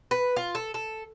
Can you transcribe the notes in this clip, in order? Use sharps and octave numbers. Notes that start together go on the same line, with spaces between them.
B4
F4
A4
A4